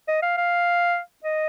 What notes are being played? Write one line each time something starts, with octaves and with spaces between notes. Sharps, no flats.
D#5
F5
F5
D#5